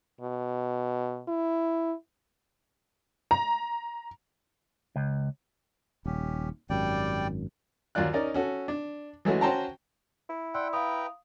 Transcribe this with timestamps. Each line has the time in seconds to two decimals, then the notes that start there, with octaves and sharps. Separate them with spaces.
0.21 B2
1.28 E4
3.31 A#5
4.96 C#2
6.06 D#1 C#4 G4
6.70 G#1 F#2 G3 D5 G5
7.95 D#2 F#3 F4 D5 F#6
8.13 C#4 D#4 A#4 D5
8.34 C#4 F#4 A4
8.68 D4
9.25 E3 F#3 G#3 A3 C#4 F#4
9.41 C#4 F#4 C5 G5 A5 A#5
10.29 E4
10.54 D5 F#5 G5 C6 E6
10.73 B4 F5 G5 A#5 D#6